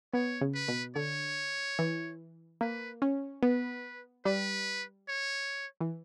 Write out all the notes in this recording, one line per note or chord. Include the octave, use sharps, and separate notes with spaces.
B3 C#5
C#3
B4
B2
D3 C#5
E3
A#3 B4
C#4
B3 B4
G3 B4
C#5
E3